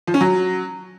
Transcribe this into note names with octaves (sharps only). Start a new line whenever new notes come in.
F3
C#4
F#3